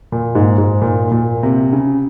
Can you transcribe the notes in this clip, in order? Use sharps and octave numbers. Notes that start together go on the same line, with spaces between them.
A#2
G#2
G#2
A#2
A#2
C3
C#3